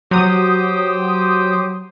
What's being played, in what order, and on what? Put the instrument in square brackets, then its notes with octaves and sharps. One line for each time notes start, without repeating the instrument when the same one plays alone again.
[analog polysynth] F#3 D#6 [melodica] G4 C5 G5